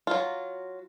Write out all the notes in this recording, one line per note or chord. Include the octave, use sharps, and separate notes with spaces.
F#3 F4